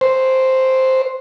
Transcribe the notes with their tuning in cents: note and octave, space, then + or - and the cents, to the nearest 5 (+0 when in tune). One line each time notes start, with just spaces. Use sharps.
C5 +0